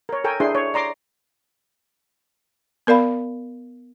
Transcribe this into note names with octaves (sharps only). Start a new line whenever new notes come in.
A#4 C#5
A4 A#4 G5 G#5
D4 E4 G#4 C5 C6
C#5
D5 A#5 C6 D6
B3 A#4 D5 F5 B5